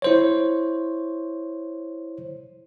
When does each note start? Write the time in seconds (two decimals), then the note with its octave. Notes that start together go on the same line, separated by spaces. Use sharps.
0.02 E4 C5 C#5